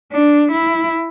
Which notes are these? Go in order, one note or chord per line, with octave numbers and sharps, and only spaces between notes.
D4
E4